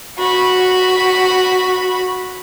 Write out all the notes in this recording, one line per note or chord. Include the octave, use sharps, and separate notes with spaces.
F#4 B5